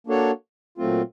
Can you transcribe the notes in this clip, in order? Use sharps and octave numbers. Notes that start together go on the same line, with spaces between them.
A#3 D4 F#4 A4 C#5
A#2 F#3 A3 C4 F4